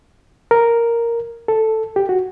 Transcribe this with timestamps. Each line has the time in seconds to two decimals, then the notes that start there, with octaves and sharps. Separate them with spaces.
0.51 A#4
1.48 A4
1.96 G4
2.09 F#4